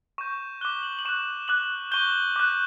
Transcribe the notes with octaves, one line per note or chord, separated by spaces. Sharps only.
C#6 G6 E7
D6 F#6 G7
F#7
F#7
C#6 F#6 E7
D6 F#6 F#7
C#6 G6 G7
D6 F#6